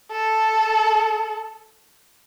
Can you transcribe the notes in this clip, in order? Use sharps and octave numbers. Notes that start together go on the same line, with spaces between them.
A4